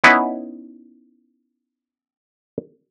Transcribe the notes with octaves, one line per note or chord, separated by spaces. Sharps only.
B3 C#4 D#4 E4 B4